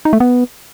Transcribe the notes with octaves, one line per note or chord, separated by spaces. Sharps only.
D#4
A3
B3